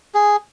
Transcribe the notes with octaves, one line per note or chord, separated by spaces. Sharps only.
G#4